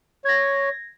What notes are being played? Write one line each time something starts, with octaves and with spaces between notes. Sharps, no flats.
C#5 G#6 A#6